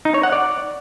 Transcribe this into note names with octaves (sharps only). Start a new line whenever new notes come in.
D#4
C#5
F#5
D5